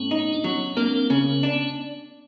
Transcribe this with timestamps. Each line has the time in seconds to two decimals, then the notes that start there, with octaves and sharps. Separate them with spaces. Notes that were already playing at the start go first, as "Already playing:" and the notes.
Already playing: A2 B3 C#4
0.11 D#4
0.33 D4
0.44 F#3 B3 C#4
0.77 A#3 C4 D4
1.10 C#3 B3 C#4
1.43 D4